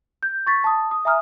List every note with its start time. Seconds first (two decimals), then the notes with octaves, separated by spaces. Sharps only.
0.23 G6
0.47 C#6 A6 B6
0.64 A5 D#6
0.91 D#6
1.05 E5 G#5 A#5 D#6 F6